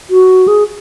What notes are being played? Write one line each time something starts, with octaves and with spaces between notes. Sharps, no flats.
F#4
G#4